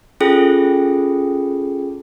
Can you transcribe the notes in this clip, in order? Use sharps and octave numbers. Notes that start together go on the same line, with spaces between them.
C#4 F4 G#4 A4 G5